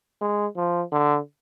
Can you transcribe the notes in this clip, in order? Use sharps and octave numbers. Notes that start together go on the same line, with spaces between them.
G#3
F3
D3